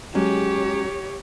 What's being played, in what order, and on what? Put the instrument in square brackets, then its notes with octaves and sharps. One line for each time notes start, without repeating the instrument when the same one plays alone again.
[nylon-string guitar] F#3 G#3 C#4 [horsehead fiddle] G4 C#5